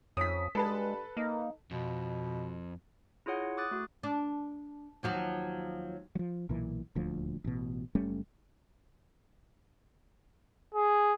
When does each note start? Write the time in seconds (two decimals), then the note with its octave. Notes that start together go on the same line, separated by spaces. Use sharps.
0.17 F2 C#4 D#6 B6
0.55 G2 G#3 A4 B4 A5
1.17 A#3 D#4
1.71 F2 B2
3.26 E4 F4 G#4 C#5 F#5
3.57 D6 D#6 F#6 A6
3.71 A3 F#4
4.03 D4
5.03 D#2 F3 F#3
6.15 F3 F#3
6.49 B1 A#2 E3
6.95 D#1 D2 F3
7.44 A1 B2
7.95 F#1 G3 A3 C#4
10.75 G#4